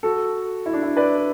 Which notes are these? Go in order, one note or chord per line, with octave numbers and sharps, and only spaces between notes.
F#4 A4
E4
D4
E4
B4 D5